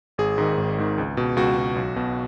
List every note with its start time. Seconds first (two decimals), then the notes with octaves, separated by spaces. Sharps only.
0.18 G#1 G#4
0.38 G#2 D#3
0.57 G#1
0.78 G#2 D#3
0.98 C#2
1.17 B2
1.37 C#2 F#4
1.57 B2
1.76 B1
1.96 B2